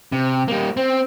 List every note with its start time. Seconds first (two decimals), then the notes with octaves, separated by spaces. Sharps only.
0.12 C3
0.48 G3 A#3
0.77 C4